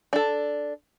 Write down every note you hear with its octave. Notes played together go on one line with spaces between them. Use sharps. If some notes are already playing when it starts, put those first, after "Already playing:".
D4 A4